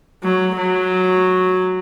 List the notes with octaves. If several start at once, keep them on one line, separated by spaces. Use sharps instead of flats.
F#3
F#3